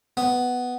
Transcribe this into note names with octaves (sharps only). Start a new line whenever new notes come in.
B3